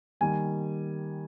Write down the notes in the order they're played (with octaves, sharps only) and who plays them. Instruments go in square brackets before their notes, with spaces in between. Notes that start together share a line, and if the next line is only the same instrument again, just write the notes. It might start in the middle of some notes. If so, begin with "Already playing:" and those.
[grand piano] D#3 G3 A#3 G#5